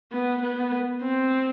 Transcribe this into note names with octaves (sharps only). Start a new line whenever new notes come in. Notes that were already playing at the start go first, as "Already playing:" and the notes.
B3
B3
C4